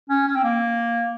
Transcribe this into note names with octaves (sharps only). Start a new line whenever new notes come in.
C#4
C#4
C4
A#3